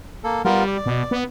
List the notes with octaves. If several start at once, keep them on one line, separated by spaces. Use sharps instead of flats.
A#3 A4
G3 B3 F4 A#4
D5
B2
B3